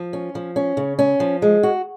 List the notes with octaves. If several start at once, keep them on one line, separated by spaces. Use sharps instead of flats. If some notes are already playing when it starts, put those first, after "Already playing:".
Already playing: F3
C#4
F3
C#4
C#3
C#4
F3
G#3
F#4